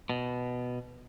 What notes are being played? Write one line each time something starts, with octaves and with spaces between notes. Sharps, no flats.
B2